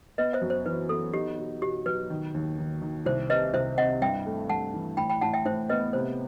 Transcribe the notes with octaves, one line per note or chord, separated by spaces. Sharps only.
B3 B4 D#5
C5 E5
F#2
C5
E3 B4
B3 A4
D#4 G4
B2
B2 G4
F#3 B4
D#3
D#2
D#3
D#3
C2 C5
C3 B4 D#5
C2 C5 E5
C4 D#5 F#5
G2 E5 G5
A3
G2 F#5 A5
E3
A2 G5 B5
G5 B5
A2 F#5 A5
E5 G5
A2 C5 E5
B3 B4 D#5
C3 C5